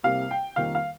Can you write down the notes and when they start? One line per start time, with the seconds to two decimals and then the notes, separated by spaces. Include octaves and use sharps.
0.03 C2 C3 G3 A#3 F5
0.31 G5
0.56 F2 D#3 G3 A#3 F5
0.75 F5